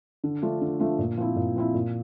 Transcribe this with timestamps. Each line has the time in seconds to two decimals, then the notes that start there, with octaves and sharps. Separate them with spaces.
0.24 D3
0.42 F3 A3 D4 F4
0.61 D3
0.80 F3 A3 D4 F4
0.99 A#2
1.17 F3 C4 E4
1.36 A#2
1.56 F3 C4 E4
1.74 A#2